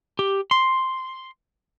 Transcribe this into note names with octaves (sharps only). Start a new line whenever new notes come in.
G4
C6